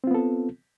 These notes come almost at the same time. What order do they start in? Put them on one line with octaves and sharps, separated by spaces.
C4 F4 B3 A4